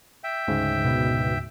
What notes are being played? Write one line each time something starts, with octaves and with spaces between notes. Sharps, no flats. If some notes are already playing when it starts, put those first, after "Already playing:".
E5 G5
D2 G#2 C#3
B2